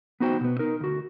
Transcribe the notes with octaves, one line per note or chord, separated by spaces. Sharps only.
B3 D#4 F#4 C5 G5
B2 B3
D#4 A#4
D2 F#4